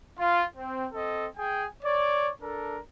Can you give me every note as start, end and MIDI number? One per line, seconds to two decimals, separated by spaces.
0.18 0.44 65
0.56 0.86 60
0.93 1.27 60
0.93 1.27 69
0.93 1.27 75
1.38 1.66 68
1.38 1.66 79
1.38 1.66 80
1.83 2.31 73
1.83 2.31 74
2.42 2.79 62
2.42 2.79 69
2.42 2.79 70